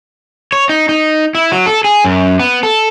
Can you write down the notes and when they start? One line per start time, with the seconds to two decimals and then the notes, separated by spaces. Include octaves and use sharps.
0.52 C#5
0.69 D#4
0.89 D#4
1.35 E4
1.52 F#3
1.66 A4
1.84 G#4
2.05 F#2
2.39 B3
2.63 A4